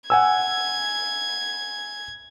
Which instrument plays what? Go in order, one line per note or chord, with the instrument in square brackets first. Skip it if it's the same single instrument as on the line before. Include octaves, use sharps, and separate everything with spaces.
[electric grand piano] F#5 G#5 E6 [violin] G#6